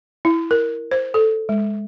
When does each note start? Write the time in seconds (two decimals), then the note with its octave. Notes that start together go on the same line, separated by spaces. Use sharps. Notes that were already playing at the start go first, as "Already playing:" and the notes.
0.25 E4
0.51 A#4
0.91 C5
1.14 A4
1.49 G#3